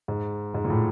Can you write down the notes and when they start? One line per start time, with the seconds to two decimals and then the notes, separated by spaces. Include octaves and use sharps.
0.08 G#2
0.54 G#2
0.64 A#2
0.70 A2